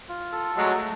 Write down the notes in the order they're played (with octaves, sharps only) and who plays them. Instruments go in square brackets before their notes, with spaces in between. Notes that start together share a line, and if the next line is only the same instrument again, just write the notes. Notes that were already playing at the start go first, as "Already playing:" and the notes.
[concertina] F4
A4
[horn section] F#3 G#3 [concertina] A3